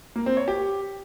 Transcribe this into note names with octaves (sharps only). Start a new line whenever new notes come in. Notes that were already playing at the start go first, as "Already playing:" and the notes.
A#3
C4
C#5
G4